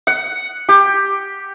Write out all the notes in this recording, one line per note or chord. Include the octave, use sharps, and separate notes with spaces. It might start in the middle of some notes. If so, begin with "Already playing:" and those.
F#5
G4